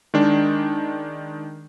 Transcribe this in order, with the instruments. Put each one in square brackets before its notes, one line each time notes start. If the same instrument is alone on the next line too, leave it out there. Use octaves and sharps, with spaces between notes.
[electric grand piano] D#3 G#3 D4